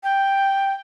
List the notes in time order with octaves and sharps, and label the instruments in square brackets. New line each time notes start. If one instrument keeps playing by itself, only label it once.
[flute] G5